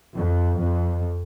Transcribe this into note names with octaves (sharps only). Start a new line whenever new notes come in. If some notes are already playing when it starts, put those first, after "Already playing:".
F2
F2